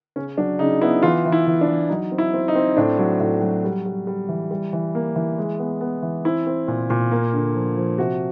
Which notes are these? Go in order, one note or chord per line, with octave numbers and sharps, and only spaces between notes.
C#3 C#4
F#3 D4
C#3 D#4
B3 E4
E3 F4
E3
E4
E3
D4
E3
F#3 D#4
C4
E4
C4
D#4
C4
A2 D4
F#3
A2
F#3
G3
G3
G3
E3
G3
E3
A#3
E3
G#3
B3
B3
E3
C4 E4
C4
A#2
A#2
A#3
D3
F3
F3
C3 F#4